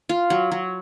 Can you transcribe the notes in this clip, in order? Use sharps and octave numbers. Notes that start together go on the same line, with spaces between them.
F4
F#3
F#3